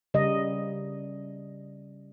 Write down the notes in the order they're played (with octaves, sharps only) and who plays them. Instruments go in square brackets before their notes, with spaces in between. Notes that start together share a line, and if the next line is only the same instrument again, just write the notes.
[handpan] C#3 G3 D#5